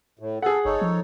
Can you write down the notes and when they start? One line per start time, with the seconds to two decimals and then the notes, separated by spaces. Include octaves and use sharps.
0.19 A2
0.43 G#4 A4 F#5
0.65 G1 D#4 A4 C#5
0.82 F3